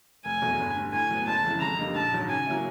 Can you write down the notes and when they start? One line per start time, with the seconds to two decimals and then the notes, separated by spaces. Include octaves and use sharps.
0.25 F1 G#5
0.42 E2 B2 F#3 A3
0.59 G1
0.76 G2 D3
0.93 A2 G#5
1.11 F#3 B3
1.27 F#1 A5
1.44 F2 C#3 E3
1.61 F2 A#5
1.78 D3 G3 A#3 D#4
1.95 A#1 A5
2.12 G#2 D#3 F#3
2.29 C#3 G#5
2.46 F#3 A#3 C#4 E4